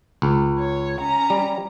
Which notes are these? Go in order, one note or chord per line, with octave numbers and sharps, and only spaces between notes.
C#2
C#5
C#4 A#5
G3